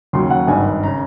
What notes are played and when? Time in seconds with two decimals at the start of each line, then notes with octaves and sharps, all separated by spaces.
0.13 D#2 C#3 F#3 C6
0.30 F#5
0.47 G#1 G2 D#3 G#5
0.83 C#3 A#5